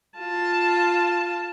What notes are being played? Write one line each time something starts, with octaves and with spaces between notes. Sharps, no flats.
F4 A5